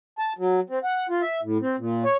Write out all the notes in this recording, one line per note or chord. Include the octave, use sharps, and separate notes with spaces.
A5
F#3
C4
F#5
F4
E5
A2
C4
A#2
C#5